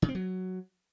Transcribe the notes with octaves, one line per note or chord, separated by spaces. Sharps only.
C#3
C4
F#3